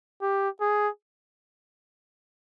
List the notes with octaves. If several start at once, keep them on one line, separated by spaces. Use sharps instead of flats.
G4
G#4